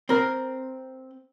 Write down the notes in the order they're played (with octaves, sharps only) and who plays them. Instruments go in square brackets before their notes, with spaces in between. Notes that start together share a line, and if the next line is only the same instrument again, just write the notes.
[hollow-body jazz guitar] C4 A#4